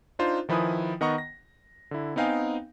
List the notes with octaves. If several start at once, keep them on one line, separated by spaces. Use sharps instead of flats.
D4 D#4 F4 C5
D#3 F3 E4 B4 G#5 D#6
D#3 B3 D#5 F#5 A#5 C#6
A#6
D3 E4
B3 C4 D#4 F5 G5 G#5